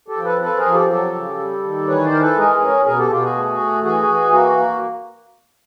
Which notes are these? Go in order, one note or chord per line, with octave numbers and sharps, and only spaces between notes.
G4 A4
F3
A4 B4
C4 A4 B4
G#4 A#4
F3
G4 A4
F#3 G4 A4
C#3
G3
D#3
E3 B4 C#5
C5 D5
E3 A#4
A4 B4
G#3 G#4 A#4
C#4
B2 G#4 A#4
G4 A4
B2 F4 G4
F#4 G#4
A3
A3
E3 F#4 G#4
E3
A#3 F#4
A#3